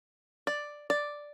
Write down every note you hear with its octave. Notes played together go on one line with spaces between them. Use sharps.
D5
D5